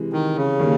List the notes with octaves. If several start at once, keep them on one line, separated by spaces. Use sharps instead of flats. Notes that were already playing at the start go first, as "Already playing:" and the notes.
Already playing: C3 E3 G#3
D#3
C#3
D#3 G3 A#3